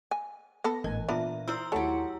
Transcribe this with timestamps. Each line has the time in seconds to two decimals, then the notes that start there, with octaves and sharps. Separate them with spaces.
0.11 G#5
0.64 B3 A4 A#6
0.84 G#1 A2 E3 G#5
1.09 A#2 B3 D4 F4 E5 A#5
1.48 E4 A#4 C5 E6
1.72 D#2 F#3 A3 G4 A4 C#7